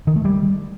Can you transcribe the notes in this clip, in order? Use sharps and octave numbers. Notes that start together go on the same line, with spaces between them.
D#3
A3
G3